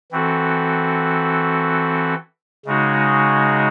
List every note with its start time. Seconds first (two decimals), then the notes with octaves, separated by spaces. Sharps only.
0.12 E3 C4 F#4 A4
2.66 C#3 G#3 D#4 F#4